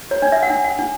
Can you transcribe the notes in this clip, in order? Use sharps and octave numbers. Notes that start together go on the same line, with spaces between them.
C#5
D4 D5
E5
F#5
D4
F#5
D4